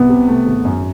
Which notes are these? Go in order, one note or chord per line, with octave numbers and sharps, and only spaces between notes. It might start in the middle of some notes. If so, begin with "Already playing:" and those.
Already playing: C2 B3
C3
A3
G#1
F#2